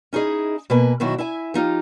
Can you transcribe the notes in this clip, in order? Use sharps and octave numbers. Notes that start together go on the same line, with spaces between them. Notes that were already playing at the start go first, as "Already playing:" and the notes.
C#4 D#4 E4 G#4 D#5
B2 A#3 B4 G#5
B2 D#3 F#3 E4 F#4
E4 E5 G#5
F3 D#4 F4 G4